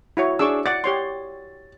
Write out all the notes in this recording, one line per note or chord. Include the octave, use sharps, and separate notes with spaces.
E4 F#4 C#5
D4 G#4 C#6 D6 E6
D5 F#5 D6 A6
G4 C#5 C6